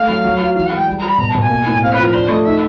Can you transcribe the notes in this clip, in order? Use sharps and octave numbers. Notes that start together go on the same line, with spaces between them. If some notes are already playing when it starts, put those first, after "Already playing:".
Already playing: A3 F5
F#3
F#3
F#4
E3 F5
F#5
G#3
G5
G3
G3 A#5
B5
B2 A#5
A5
B2
G#5
A#3
A2
C4 F5
B4
F3
A#4
D4 C5
A3 D#5
D#4 E5